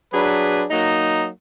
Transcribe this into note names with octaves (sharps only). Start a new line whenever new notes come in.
F#3 D4 G#4 B4
F#3 A#3 D#4